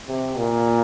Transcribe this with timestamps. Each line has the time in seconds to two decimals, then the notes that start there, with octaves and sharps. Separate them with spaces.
0.08 C3
0.37 A#2